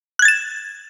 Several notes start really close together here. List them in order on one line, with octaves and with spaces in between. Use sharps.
F#6 G#6 A6 E7